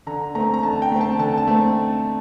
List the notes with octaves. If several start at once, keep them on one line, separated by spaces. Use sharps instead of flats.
D3 A#5
A3 C4 A#5
A#5
D3 A5
G5
A3 C4
A5
D3 A5
A5
A3 C4